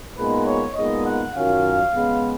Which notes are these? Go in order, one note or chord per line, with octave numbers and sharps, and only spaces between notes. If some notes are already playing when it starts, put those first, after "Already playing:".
A#2 G#3 B3 D#4 B4
C#5
A#2 G#3 B3 D#4 D#5
F#5
F#2 D#3 F#3 C#4 F4 F5
C#3 G#3 B3